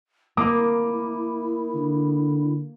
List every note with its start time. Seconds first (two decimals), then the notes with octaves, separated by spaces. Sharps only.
0.37 A#3 E4 D6 D#6
1.75 D3